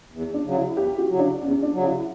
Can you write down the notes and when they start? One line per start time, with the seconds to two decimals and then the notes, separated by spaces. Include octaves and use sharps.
0.12 E2
0.34 D4
0.44 C#3 F#3
0.55 E4
0.76 E2 G4
0.98 F#4
1.09 C#3 F#3
1.19 D4
1.41 E2 C#4
1.63 D4
1.73 C#3 F#3
1.84 E4